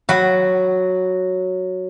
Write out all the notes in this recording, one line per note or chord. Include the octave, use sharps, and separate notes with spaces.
F#3 F#5 B5